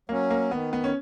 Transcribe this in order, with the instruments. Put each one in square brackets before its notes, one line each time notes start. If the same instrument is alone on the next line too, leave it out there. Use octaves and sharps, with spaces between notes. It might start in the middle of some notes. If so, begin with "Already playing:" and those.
[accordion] F#3 C#4 [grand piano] A#3
[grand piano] A#3
[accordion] D#3 [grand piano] B3
[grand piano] B3
C#4